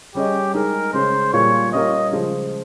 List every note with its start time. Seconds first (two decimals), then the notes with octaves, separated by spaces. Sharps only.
0.15 G3 C#4 G4 G#4 D#5
0.54 G#3 D#4 G#4 A#4
0.93 C#3 G#3 C#4 C5
1.33 A#2 G3 A#3 F4 G#4 C#5
1.72 G3 C#4 F4 A#4 D#5
2.12 C#3 F3 G#3